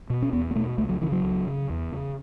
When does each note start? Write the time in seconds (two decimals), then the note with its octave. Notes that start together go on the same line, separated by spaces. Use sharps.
0.10 B2
0.22 C#4
0.33 E2 B3
0.51 B3
0.55 B2 A3
0.78 C#2 A3
0.89 F#3
1.01 C#3 E3
1.12 F#3
1.23 C#2
1.47 C#3
1.70 E2
1.92 C#3